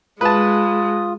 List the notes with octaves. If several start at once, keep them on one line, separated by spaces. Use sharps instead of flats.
G#3 F4 B4 A5 D#6